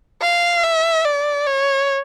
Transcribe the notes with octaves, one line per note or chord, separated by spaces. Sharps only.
F5
E5
D5
C#5